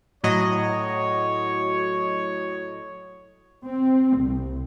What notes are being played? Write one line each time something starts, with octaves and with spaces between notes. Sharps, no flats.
A2 F#3 C#5 D#5
C4
C2